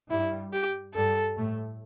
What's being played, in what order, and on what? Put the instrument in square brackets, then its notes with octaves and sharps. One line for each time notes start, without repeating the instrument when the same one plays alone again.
[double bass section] G2 G3 [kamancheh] E4
[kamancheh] G4
[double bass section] G2 G3 [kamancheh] A4
[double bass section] A2 A3